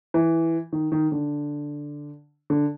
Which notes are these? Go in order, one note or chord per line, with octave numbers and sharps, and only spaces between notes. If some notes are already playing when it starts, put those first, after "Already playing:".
E3
D#3
D#3
D3
D3